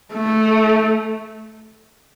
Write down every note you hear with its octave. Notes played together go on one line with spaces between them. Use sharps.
A3